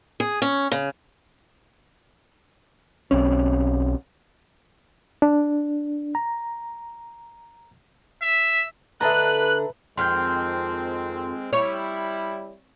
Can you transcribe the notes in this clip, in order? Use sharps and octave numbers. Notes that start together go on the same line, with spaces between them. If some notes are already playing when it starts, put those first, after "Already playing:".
G#4
C#4
C#3
B1 C4 C#4
D4
A#5
E5
D3 A4 B4 D#5 E5 A5 A#5 F#6
F2 D#3 G#3 C4 C6 F6 G6
G3 E4 C#5